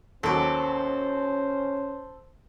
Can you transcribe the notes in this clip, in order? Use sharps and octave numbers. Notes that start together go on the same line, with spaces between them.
D#2 F#3 C#4 A4 C5 D6